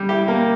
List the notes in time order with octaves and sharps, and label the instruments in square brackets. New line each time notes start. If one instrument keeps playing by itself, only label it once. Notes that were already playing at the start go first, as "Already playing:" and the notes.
Already playing: [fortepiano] G3
E4 G4
A#3